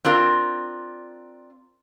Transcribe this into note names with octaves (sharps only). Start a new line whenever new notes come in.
C4 D4 F4 A#4